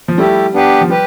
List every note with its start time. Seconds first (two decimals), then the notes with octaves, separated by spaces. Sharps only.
0.08 F3
0.18 G3 A3 E4 G4
0.54 B3 D4 G4 B4
0.81 F3
0.89 G3 G4 B4